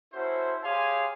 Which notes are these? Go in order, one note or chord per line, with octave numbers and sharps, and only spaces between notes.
C#4 E4 F#4 A4 C5
G4 G#4 C#5 F5 G#5 C6